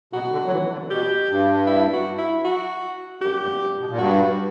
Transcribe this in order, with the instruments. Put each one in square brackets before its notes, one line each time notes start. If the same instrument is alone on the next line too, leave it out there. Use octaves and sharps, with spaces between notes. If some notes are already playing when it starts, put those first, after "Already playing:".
[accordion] B2 [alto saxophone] F#4
[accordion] D3
F#3
E3
D3
[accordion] B2 [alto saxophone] G4
[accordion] G2
[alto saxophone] E4
F#4
E4
F#4
[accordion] F#2 [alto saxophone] G4
[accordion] G2
G2
B2
A#2
[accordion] G2 [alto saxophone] F#4